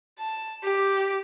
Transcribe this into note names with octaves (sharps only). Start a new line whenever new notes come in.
A5
G4